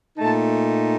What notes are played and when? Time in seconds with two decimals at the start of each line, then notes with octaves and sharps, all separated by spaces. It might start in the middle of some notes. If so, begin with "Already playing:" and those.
0.18 A#2 A3 D#4 A5